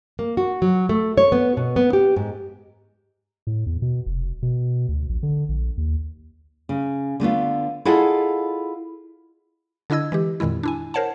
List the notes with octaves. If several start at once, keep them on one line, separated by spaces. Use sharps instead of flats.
A#3
F#4
F#3
A3
C#5
B3
B2
B3
G4
G#2
A2
E2
B2
F1
B2
D2
A#1
D3
A#1
D#2
C#3
D3 A3 B3 F4
E4 F4 G#4 A4 D#5 F#5
D3 D4 E4 D#5 E6 G#6
E3 G#3 G4
F2 A#2 D#3 G#3 E4
D4 E4 G#5
A#4 C5 C#5 F#5 A5